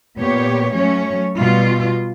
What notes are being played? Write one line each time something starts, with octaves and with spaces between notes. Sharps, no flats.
A#2 B3 G4 C#5
F#3 A3 C#4 C#5
B2 G3 F4